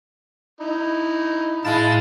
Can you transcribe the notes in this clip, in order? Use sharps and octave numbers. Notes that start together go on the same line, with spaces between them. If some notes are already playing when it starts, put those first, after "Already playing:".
D#4 E4
A2 G#3 E4 F5 A5 A6